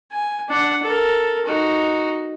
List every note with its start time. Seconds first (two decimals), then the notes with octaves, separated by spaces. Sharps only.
0.11 G#5
0.48 D4 F#5
0.82 A4 A#4
1.45 D#4 F#4